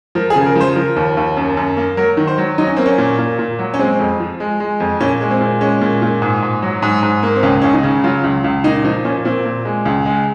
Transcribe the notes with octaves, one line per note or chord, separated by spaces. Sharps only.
F3 A#4
G#4
C#3
A#4
F3 C5
F3 A#4
D#2
D#2
F#2
F#2
A#3
F#3 A#4
D#3
C5
F#3
F#3 D#4
C#4
A#3 C4
C#4
A#2
A#2
A#2
F#3
C#4
G#3 C4
F2
F3
G#3
G#3
F2
A#2 C#4
G#3
C4
A#2
G#3 C#4
A#2
A#2
G#2
G#2
F#3
G#2
G#2
A#3
C4
C#2 C#4
C#2 C#4
D#4
C#3
F#3 F4
C#2
C#2
A#2 D#4
F3 D#4
A#2 C#4
A#2 C4
A#2
G#3
C#2
G#3